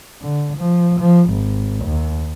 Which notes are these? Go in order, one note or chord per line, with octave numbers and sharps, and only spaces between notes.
D3
F3
F3
G#1
D#2